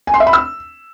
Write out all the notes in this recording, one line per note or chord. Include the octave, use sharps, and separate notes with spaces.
G#5
C6
E5
B5
E6